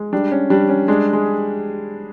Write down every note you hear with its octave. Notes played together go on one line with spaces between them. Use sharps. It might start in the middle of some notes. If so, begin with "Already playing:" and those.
Already playing: G#3
G3 D4
C#4
G3 D4
C#4
G#3 D4
G#3 G#4